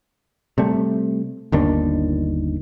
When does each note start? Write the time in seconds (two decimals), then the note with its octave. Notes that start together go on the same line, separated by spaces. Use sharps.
0.58 C3 G3 A3
1.52 G1 D#2 D#3 D4